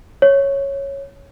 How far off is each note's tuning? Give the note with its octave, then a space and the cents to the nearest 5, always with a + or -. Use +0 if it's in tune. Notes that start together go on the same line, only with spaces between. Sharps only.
C#5 -5